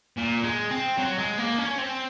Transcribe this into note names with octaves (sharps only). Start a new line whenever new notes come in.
A#2
G#3
C4
F#3
G#3
A#3
C#4
C4